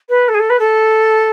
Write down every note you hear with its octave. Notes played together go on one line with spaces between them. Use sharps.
B4
A4
G#4
A4
B4
A4